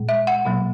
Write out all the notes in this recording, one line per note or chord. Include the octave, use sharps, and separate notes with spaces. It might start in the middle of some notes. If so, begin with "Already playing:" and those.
Already playing: A#2 G#3
E5
F#5
B2 F#3 A#3